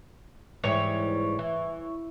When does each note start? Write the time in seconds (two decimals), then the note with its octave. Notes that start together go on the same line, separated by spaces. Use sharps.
0.64 G#2 E3 G3 C#5
1.39 E3